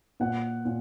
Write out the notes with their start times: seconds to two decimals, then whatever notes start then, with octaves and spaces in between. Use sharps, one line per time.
0.20 A#2 F#5
0.65 A#2